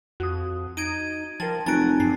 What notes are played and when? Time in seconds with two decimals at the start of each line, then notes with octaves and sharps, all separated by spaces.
0.20 F2 F#4 D#6
0.77 D#4 G#6 D7 D#7
1.40 F3 A#4 G5 A5 A6
1.66 F1 F#3 G#5 A#5 F#6 A6 D7
2.00 G2 C7